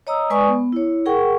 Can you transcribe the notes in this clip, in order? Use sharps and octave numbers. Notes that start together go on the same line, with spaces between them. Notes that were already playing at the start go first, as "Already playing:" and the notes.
C#5 D#5 A#5 D#6 E6
G#3 B4 D5 G#5 C#6 D#6
B3
E4 C#5
G#4 A#4 F#5 G5 C#6